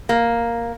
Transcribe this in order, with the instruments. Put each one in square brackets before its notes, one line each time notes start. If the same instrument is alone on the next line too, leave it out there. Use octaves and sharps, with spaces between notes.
[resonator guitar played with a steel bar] A#3